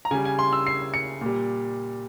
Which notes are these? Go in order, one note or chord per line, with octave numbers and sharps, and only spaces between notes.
A#5
C#3 G3 G#5
G#5
C6
E6
C7
C#7
A#2 G3